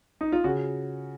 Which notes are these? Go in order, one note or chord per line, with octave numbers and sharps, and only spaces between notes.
D#4
F4
C#3 F#4